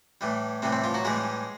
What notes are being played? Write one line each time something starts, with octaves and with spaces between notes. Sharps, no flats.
A2 E3 G3
A2 C3 E3 G3 C4
C3 C4
F3 F4
F#3 F#4
A2 E3 G3 G#3 G#4